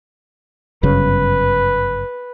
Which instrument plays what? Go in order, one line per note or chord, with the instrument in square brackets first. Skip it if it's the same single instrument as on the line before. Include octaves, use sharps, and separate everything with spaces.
[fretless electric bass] G1 F#2 C#3 [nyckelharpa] B4